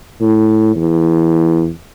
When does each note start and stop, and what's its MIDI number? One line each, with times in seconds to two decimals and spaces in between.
0.21 0.75 45
0.76 1.69 40